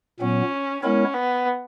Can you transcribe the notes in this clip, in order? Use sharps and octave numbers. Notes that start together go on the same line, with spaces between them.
A#2 F#3 B3 C#4
G#3 B3 C#4 E4 A#4 C#5
B3